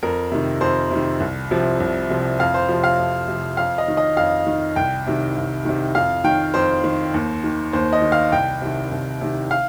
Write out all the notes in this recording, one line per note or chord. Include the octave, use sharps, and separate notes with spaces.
F2 A#4
C3 D#3
F2 C5
C3 D#3
C2
C3 F3
C2
C3 F3
F2 F5
C5
C3 F3
F5
F2
C3 F3
F2 F5
D#5
D#3
D#5
F2 F5
D#3
C2 G5
C3 D#3
C2
C3 D#3
F2 F5
D#3 G5
F2 C5
D#3
D#2
D#3
D#2 C5
D#5
D#3
F5
C2 G5
C3 D#3
C2
C3 D#3
F5